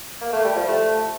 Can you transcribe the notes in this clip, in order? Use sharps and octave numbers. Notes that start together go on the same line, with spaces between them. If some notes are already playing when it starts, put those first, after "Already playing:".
A#3
A3
G3
F3
A3